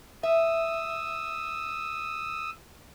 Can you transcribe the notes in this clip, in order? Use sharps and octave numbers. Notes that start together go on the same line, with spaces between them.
E5 D#6 E6